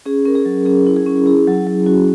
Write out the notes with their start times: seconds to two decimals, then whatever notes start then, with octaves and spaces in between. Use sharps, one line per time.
0.06 C#4 G#4
0.26 C#4 A#4
0.35 G#4
0.45 F#3
0.65 C#4 G#4
0.87 E4
0.96 G#4
1.06 C#4
1.26 E4 G#4
1.47 F#3
1.67 F#3
1.86 C#4 F#4